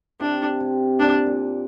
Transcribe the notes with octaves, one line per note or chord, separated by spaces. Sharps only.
C3 D4
C3
A#2 D4
A#2